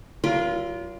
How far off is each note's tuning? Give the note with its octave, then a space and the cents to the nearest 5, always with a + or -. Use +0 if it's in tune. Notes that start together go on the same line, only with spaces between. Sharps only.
F#3 +40 F4 -15 A#4 +30